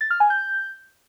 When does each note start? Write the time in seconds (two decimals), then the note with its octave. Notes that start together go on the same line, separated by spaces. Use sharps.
0.01 A6
0.11 F6
0.20 G#5
0.30 G6